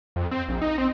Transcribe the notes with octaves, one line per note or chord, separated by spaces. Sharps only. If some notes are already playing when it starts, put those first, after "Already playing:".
F2
C4
A#1
D#4
C4